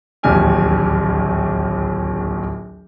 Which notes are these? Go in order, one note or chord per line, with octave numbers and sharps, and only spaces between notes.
D1 A#1 D#2 G4 G#5 F6